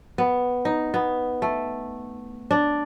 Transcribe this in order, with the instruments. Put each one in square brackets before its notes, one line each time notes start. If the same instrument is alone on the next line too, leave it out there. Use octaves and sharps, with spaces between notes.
[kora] B3
D#4
B3
A3
D4